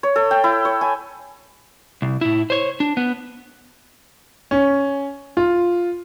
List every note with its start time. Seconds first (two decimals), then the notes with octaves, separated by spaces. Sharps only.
0.03 C#5
0.16 A4
0.31 G5
0.44 E4
0.65 C#5
0.81 G#5
2.02 C2
2.21 A2 E4
2.50 C5 C#5
2.80 D4
2.97 B3
4.51 C#4
5.37 F4